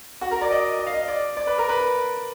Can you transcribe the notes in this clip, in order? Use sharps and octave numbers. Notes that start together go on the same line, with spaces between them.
F#4
A#4
D5
D#5
D#5
F5
D#5
D5
D5
B4
A#4
B4